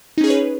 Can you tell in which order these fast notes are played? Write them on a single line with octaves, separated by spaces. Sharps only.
D#4 C#4 G#4 C#5 B4